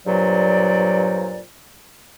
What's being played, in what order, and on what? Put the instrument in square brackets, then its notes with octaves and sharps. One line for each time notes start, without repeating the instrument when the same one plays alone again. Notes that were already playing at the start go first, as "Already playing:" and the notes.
[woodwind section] G2 A#2 F#3 C5 D5